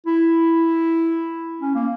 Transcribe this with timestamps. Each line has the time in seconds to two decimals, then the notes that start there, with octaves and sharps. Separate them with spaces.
0.06 E4
1.61 C#4
1.75 A#3